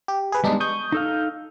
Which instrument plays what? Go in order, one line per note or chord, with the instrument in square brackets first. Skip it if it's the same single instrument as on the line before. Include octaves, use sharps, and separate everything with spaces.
[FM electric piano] G4
G#4 B4
[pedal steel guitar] G3 G#3 [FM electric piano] B3 D4 D#4
[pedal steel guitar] C#6 [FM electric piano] D#6 G6
[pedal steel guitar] D#4 A4 F5